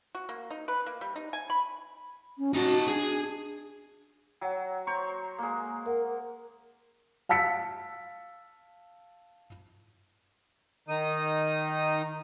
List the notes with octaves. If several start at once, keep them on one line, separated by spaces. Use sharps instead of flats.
F#4
A#3
D#4
B4
A#3
G3
D#4
G#5
B5
C#4
D#4 F#4 A5
D4 G#4
F#3 F#5 G5
C5 A#5 C#6
G#3 A#3
A#4 F#5
F5 A5 E6 B6 C#7
D#3 D#4 D#6